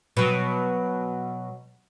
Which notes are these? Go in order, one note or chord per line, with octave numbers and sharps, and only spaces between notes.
B2 F#3